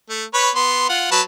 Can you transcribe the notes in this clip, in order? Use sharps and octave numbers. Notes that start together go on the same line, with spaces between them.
A3
B4 C#5
B3 C6
F4 F#5
F#3 B4 A5